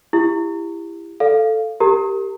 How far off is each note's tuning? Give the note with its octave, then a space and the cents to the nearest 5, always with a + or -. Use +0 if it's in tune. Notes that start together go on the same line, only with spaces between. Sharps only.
E4 +20 G4 +25
A4 +0 D5 -5 F5 -5
G4 +0 A#4 -25 A#5 -30